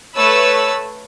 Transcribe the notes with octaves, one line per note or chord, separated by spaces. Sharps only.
A3 B4 C#5 A5 B5 E6